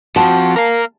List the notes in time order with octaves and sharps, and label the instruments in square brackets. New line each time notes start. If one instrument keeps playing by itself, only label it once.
[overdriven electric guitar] F3 C4 [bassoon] F#4 [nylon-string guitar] A5
[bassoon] A#3 [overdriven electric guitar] A#4 F5